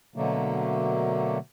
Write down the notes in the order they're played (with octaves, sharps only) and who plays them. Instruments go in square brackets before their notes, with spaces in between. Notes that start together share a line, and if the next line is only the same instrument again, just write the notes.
[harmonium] B2 D3 F#3 A3 A#3